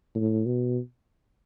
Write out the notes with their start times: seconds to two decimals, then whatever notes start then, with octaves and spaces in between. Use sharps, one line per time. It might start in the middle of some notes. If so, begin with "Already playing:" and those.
0.15 A2
0.46 B2